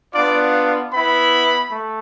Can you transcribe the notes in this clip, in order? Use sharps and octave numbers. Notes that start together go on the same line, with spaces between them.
B3 D4 F4 D5
B3 E4 B5
A3